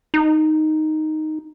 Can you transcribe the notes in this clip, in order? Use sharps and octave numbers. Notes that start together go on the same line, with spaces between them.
D#4